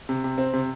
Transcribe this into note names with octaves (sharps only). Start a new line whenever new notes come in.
C3
C3
C4
C3